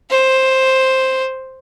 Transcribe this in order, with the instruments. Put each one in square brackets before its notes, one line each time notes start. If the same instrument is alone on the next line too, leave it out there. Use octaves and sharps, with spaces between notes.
[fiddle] C5